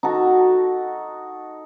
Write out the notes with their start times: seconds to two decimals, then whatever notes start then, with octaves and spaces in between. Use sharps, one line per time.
0.03 D#4 F#4 A4